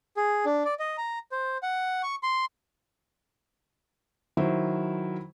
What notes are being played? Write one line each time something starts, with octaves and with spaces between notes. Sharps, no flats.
G#4
D4
D5
D#5
A#5
C5
F#5
C#6
C6
D#3 F#3 E4 C5